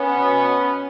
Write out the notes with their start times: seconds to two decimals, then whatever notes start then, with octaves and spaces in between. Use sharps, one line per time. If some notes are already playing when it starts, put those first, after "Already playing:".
Already playing: B3 C#4
0.15 B2